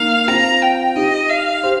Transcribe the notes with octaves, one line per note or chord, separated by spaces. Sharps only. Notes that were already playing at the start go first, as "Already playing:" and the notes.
Already playing: A#3 D#4 F5
C4 F4 A#5
G5
D#4 G4 D#5
F5
G4 C5